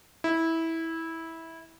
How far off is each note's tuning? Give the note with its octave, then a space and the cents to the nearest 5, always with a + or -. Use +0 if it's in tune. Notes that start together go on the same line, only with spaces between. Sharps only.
E4 -15